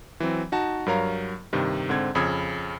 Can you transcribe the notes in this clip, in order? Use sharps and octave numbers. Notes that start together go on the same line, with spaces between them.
E3 F#3 C4
D#4 F#4 A5
G2 F#3 A#4 C#5 F5 A#5
G2 C3 D#3
G#2 D3 C4 G#6
F2 C#3 B5 D#6 E6 G#6